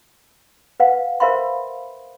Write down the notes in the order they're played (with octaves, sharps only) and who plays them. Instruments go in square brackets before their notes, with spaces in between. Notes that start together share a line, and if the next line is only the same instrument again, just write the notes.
[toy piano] B4 F5 F#5
A#4 C5 E5 F5 B5 C6